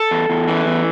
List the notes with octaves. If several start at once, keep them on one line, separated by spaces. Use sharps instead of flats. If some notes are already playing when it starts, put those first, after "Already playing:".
Already playing: A4
E2
E2
E3
E2